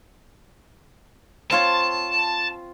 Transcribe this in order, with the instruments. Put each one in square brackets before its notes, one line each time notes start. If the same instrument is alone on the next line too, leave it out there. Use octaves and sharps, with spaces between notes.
[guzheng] C4 F4 C#5 [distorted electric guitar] A5